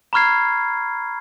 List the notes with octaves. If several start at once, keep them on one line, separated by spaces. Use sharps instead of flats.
A#5 B5 C#6 F6 G#6 C7